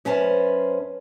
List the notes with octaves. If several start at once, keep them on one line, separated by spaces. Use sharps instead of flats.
F#2 C#4 B4 C5 A5